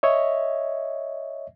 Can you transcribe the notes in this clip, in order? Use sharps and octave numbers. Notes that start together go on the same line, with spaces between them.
C#5 D#5 E5